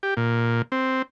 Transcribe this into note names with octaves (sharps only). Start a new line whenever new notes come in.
G4
A#2
C4